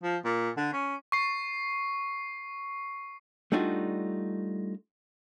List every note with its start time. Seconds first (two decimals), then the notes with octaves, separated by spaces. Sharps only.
0.03 F3
0.25 A#2
0.57 D3
0.73 C#4
1.12 C#6 C7
3.52 G3 A3 D4 D#4 F4 F#4